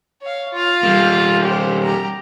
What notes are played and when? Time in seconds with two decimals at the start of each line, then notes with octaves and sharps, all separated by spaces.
0.21 C#5 F5
0.53 F4 F5
0.83 G3 A#3
1.43 G4 C5
1.84 G4 A#5